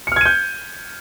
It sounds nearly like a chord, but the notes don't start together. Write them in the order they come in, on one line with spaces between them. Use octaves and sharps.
C#7 F6 G#6 D#7 G6